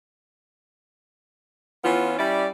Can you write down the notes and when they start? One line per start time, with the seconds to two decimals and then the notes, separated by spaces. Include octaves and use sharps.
1.84 E3 B3 C#4 F4
2.18 G3 C#4 E4 D5